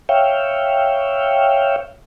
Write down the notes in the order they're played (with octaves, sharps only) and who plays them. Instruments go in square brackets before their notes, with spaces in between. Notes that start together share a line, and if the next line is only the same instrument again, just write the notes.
[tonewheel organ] C#5 E5 F5 G5